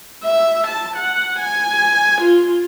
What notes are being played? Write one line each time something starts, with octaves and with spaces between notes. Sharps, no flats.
E5
A5
F#5
G#5
F4